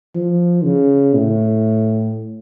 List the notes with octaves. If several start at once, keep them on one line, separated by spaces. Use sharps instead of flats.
F3
C#3
A2